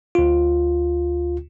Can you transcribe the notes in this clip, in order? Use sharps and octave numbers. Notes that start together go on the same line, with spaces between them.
D2 F4